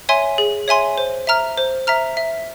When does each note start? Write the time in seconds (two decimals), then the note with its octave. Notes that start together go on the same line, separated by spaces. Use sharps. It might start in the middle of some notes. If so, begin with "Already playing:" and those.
0.09 C#5 E5 G#5 C6
0.38 G#4
0.68 C#5 E5 G#5 C6
0.98 C5
1.27 E5 A#5 F6
1.58 C5
1.87 E5 A#5 F6
2.17 E5